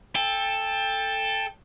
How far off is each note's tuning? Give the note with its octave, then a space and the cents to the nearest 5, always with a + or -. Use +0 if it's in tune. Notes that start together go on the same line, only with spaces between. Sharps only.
A4 +0 G5 +25